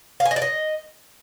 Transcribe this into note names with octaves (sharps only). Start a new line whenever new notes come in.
F5
G#5
D#5
D5
D#5